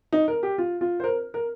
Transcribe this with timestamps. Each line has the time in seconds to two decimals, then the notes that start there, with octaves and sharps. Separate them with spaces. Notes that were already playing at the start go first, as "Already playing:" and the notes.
0.13 D#4
0.28 A#4
0.43 G4
0.58 F4
0.81 F4
1.00 C5
1.04 A#4
1.34 A#4